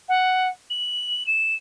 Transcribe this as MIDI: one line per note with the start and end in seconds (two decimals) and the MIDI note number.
0.09 0.49 78
0.70 1.26 102
1.27 1.55 100